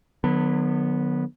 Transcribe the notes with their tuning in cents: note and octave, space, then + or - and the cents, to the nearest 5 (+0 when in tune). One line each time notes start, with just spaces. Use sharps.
D3 +45 F#3 -30 B3 -10